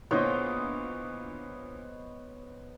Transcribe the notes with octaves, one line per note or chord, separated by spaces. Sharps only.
A#2 D3 B3 E4 C5 C#5 D#5